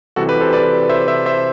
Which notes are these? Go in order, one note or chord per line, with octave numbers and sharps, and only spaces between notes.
C2 C3 E3 G3 F#4 A4
G4 B4
A4 C5
B4 D5
C5 E5
C5 E5
C5 E5